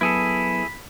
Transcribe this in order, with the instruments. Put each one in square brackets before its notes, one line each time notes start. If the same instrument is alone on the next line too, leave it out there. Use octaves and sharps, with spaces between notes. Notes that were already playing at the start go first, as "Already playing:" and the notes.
[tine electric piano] F#3 B3 B4 [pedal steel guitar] E4 G#4 A4 [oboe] B5